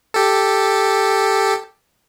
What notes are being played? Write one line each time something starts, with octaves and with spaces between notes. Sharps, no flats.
G4 A4